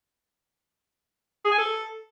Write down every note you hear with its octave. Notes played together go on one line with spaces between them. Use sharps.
G#4
G#5
A4